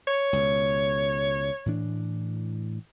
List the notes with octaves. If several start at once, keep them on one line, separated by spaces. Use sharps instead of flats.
C#5
C#2 B2
A2 E3 D4